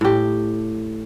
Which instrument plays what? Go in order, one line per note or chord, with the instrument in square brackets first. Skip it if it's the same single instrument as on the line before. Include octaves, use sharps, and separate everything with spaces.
[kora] A2 G4